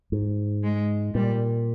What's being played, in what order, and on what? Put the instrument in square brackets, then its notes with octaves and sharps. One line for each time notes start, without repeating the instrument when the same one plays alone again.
[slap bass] G#2
[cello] G#3
[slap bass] A#2 [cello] G3